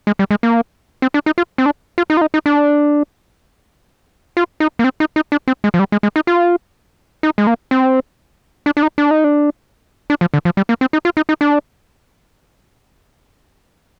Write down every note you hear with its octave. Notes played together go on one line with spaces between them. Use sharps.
G#3
G3
G#3
A#3
C4
D4
D#4
F4
C4
D4
F4
D#4
F4
D#4
D#4
D4
F4
D#4
A#3
C4
D#4
D#4
D4
C4
G#3
F3
G3
G#3
G#3
D#4
F4
D#4
G#3
A#3
C4
D4
D4
D#4
D4
D#4
D4
D4
F3
D3
F3
G3
A#3
C4
D#4
F4
D#4
D#4
D4